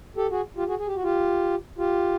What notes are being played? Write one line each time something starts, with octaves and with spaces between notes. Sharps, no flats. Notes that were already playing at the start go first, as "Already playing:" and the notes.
G4 A4
F#4 G#4
F4 G4
F#4 G#4
G#4
G4
F#4
F4 G4
F4 G4